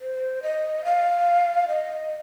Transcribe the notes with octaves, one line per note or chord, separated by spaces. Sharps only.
C5
D#5
F5
D#5